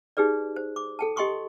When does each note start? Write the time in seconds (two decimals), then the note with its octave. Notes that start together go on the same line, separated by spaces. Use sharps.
0.17 D#4 G4 G#4 B4 D5
0.56 C5
0.76 D6
0.99 A4 G5 A5
1.16 G4 D#5 G5 C6 C#6 D#6